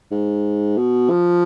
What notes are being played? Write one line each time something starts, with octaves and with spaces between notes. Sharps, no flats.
G#2
B2
F3